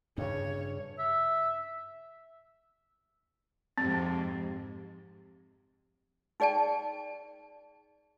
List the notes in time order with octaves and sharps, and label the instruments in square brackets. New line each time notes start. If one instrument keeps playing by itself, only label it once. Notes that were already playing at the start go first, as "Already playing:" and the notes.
[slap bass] G2 C#3 [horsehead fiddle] C#5
[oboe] E5
[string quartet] F2 G#2 C3 [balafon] C4
[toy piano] D#4 G#4 D5 G5 A5